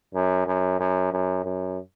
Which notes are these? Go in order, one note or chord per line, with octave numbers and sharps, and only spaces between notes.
F#2
F#2
F#2
F#2
F#2